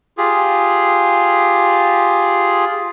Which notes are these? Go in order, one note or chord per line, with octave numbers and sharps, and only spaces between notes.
F4 G4 G#4